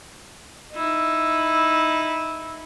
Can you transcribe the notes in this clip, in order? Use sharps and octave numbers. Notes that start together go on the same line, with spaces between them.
D#4 E4